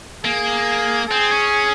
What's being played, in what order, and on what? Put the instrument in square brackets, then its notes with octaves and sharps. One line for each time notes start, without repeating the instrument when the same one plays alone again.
[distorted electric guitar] A#3 [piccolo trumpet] G#4
[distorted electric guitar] C4 [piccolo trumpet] G#4
[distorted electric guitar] C#4